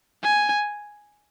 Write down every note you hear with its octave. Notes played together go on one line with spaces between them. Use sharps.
G#5